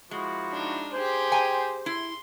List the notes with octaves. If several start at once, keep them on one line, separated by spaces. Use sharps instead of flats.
F3 G#3 E4 F#4
D4 D#4
G4 G#4 C5
G5 G#5 A#5
E4 C6